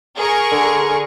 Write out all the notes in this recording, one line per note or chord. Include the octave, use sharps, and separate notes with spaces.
G#4 A#4 C#6
D3